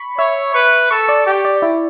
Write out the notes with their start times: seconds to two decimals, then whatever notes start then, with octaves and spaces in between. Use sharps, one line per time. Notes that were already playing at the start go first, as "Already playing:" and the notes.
Already playing: B5 C#6
0.18 C#5 E5
0.54 B4 C#6
0.91 A4 C#6
1.09 D5
1.26 G4
1.45 D5
1.62 E4